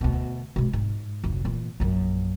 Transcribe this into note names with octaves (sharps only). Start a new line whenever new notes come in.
D2 B2
B2 G#3
G#2
F1 D2
A#2 E3
A#1 F#2